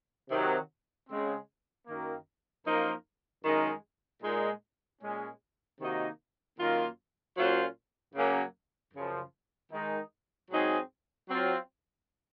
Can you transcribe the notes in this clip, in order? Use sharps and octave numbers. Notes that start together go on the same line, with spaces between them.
C3 D#3 F#3
C#3 G#3 C4
F#2 D#3 A#3
F#2 F3 A#3 D#4 A#4
F#2 D#3 G#3 D#4 A#4
A#2 G#3 D#4
A#2 G#3 C#4
C3 D#3 A#3 D#4 F#4
F#2 D#3 A#3 F4
A#2 F#3 C#4 F4 C5
F#2 C#3 F#3 A#3 C#4
F#2 C#3 F3
D#3 G#3 D#4
G#2 F#3 C4 D#4 G#4
F#3 C4 F4